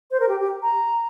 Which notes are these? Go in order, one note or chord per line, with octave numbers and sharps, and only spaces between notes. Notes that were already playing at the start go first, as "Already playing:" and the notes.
C5
A#4
G4
G4
A#5